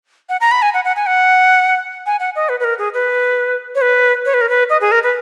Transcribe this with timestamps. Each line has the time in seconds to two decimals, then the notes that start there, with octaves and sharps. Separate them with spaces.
0.29 F#5
0.41 A#5
0.51 B5
0.62 G#5
0.74 F#5
0.85 F#5
0.96 G#5
1.06 F#5
2.06 G#5
2.20 F#5
2.36 D#5
2.49 B4
2.60 B4
2.64 A#4
2.78 G#4
2.94 B4
3.75 C#5
3.81 B4
4.26 C#5
4.34 B4
4.41 A#4
4.49 B4
4.70 D#5
4.81 G#4
4.92 A#4
5.03 B4